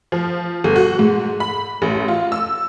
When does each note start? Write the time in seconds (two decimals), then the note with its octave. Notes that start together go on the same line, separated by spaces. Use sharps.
0.12 F3
0.64 G1
0.76 F#4
0.99 G#2
1.40 B5
1.82 A1
2.08 F4
2.32 E6